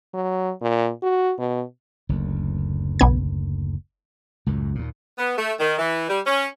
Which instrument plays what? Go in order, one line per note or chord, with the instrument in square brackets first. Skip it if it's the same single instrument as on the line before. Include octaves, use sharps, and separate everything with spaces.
[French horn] F#3
A#2
F#4
B2
[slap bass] F#1 D2
[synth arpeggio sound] B1 B3 G#6
[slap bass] C#2 F#2 A2
D#2 A#2
[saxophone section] B3
A3
D#3
E3
G3
C#4